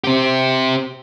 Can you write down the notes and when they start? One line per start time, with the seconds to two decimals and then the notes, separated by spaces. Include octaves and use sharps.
0.04 C4 G4